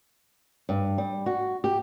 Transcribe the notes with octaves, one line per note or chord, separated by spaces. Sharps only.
G2
G3
F#4
G4